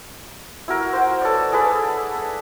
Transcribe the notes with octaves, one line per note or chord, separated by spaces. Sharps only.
E4 F#4 A#4
F#4 C5
A4 B4 C#5 D5
G#4 A4 B4 D5